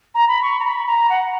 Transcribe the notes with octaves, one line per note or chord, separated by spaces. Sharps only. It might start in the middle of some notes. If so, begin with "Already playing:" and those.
A#5
B5
C#6
A#5
B5
A#5
F#5